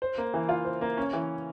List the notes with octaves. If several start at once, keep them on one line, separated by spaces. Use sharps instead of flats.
C5
A#3
E3
F4
C5
A#3
C#4
E3